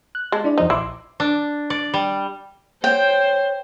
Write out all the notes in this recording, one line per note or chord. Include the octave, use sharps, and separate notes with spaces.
F#6
G#3 A5
D4 E4 D5
E2 F3 D#4 C5
A#1 E4 C6 D6
D4
D5
G3
C5 C#5 G5